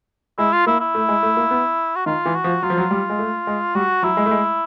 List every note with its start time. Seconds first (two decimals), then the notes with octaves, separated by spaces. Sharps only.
0.38 G#3 E4
0.52 F4
0.66 A#3 E4
0.80 E4
0.95 A3
1.09 G#3
1.23 A3
1.37 A#3
1.51 B3
1.96 F#4
2.06 D#3 F4
2.26 E3
2.35 F#4
2.44 F3
2.63 F#3 F4
2.70 F3
2.78 F#3
2.91 G3
3.10 G#3
3.19 A3
3.47 G#3
3.75 G3 F#4
4.03 F#3 E4
4.17 G#3
4.26 A3
4.31 G#3